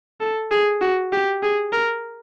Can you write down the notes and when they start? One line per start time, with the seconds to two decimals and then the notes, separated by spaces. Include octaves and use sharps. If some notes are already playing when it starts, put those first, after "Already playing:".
0.21 A4
0.51 G#4
0.81 F#4
1.12 G4
1.43 G#4
1.72 A#4